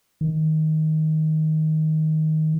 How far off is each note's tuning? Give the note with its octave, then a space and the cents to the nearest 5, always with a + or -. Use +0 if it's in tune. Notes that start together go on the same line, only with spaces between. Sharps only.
D#3 +10